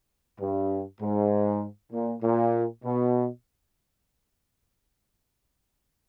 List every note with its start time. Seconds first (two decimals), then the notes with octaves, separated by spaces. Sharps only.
0.40 G2
1.01 G#2
1.93 A#2
2.23 A#2
2.84 B2